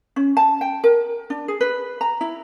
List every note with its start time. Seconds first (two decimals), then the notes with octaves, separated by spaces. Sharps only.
0.16 C#4
0.37 A5
0.61 G5
0.84 A#4
1.30 D4
1.48 G#4
1.61 B4
2.01 A#5
2.21 E4